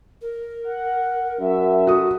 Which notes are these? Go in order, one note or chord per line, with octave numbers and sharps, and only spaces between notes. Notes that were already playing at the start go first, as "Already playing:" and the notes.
A#4
F#5
F#2 E5
F#4 A4 D#6